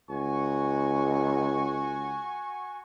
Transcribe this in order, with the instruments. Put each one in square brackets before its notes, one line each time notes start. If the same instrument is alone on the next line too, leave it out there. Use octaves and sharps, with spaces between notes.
[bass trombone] C#2 [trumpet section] F#4 G#5 C#6